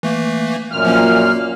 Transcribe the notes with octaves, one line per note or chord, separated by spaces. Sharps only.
E3 A3 A#3
F#2 A#2 F6
F3 A#3 C#4
A#3